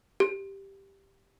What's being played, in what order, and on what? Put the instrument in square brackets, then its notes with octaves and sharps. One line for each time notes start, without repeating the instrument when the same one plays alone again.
[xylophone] G4